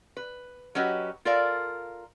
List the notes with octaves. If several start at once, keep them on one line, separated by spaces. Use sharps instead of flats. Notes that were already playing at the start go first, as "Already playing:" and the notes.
B4
F#3 C#4 F#4 G4 B4 D#5
F4 A4 A#4 D5 F5